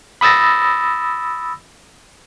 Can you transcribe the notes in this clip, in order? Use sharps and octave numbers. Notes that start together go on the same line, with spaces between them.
B5 D#6 E6 A6 A#6